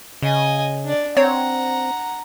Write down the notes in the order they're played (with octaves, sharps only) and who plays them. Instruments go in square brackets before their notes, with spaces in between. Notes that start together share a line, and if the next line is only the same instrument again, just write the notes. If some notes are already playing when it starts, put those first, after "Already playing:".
[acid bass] C#3 [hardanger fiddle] D#5 G#5
[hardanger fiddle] D4 D5
[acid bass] C4 [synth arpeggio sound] C#5 [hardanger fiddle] F#5 A#5